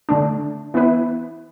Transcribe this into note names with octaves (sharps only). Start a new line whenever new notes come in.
D3 A3 D4
E3 B3 E4 B4